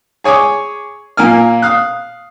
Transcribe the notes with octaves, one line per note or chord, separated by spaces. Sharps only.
G#4 C#5 G#5 C#6 D6
A#2 A#3 A#4 G#5 F6
F5 D#6 F#6